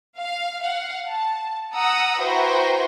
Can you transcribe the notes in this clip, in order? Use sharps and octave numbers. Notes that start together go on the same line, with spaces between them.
F5
F5 F#5
A5
F#5 A#5 D#6 E6
E4 F#4 B4 C5 G5 A#5